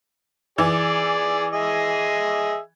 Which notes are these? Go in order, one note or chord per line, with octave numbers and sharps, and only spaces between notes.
E3 G#4 D5
G#4 D#5 E5